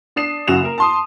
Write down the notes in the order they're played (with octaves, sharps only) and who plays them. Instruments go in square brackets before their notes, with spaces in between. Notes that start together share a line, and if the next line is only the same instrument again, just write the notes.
[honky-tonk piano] D4 D#6 C7 E7
F#1 C#3 F#3 F#4 E7 F7
A#3 A#4
A5 C6 D#6